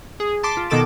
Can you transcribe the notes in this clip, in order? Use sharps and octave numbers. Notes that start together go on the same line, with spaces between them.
G#4
A5 C6 D6 B6
F4
B2 D#3 A4 D6 E7